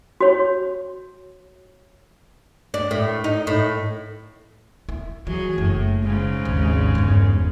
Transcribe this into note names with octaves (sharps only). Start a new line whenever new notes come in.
F#4 C#5
D4
A2
D#4
A2
E4
E3 F#3 G#4
F#1 A2
G#2 C#3
G#1 D#2
G1 E2